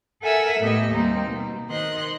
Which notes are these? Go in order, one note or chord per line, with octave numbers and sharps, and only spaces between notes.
A4 A#4 E5 F#5 G#5 E6
A2 A3 B3 G4 D#5
D#2 G3 A#3 C4 D#4
B2
D#3 C5 D#5 C6 F#6